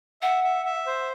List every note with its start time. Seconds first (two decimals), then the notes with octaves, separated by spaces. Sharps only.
0.22 E5 F#5
0.44 E5
0.65 E5
0.86 C5